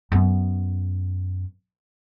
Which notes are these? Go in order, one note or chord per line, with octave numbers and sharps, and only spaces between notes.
F#2 B3